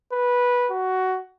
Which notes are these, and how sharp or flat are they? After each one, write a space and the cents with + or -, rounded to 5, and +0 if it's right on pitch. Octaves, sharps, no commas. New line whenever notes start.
B4 -15
F#4 +15